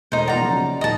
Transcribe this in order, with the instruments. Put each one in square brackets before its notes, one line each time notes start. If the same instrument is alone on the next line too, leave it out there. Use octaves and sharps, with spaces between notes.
[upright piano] E1 A3 [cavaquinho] D#4 C5
[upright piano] B2 F4 F#5 [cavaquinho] D5 A#5
[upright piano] C#3 F3 F#3
[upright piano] D#2 A#2 F3 [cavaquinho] D#5 A5